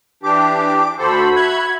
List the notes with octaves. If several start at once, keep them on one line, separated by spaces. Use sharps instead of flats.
E3 D4 G4 D6
D2 F#4 A4 C5 B5
E5 F#6 G#6